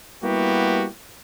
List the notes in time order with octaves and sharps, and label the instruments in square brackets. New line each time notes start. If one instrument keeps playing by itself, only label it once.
[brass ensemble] G3 A#3 B3 E4 F#4 G4